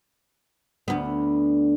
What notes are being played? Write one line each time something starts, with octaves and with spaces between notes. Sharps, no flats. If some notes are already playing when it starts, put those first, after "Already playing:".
D2 B3